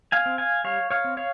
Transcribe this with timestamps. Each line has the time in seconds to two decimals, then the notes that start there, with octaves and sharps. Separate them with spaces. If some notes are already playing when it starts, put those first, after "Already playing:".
0.12 F5 G#5
0.26 C4
0.38 F5 G#5
0.64 G3 C#5 F5
0.90 C#5 F5
1.04 C4
1.17 C#5 F5